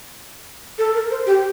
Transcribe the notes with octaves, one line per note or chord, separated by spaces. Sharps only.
A4
A#4
C5
G4